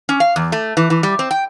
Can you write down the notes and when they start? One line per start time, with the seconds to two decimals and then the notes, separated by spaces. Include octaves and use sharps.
0.09 C#4
0.20 F5
0.36 E2
0.52 A3
0.77 E3
0.90 E3
1.03 G3
1.19 C4
1.31 G5